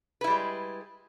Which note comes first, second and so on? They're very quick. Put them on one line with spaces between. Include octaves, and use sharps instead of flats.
B4 E4 G3 G#3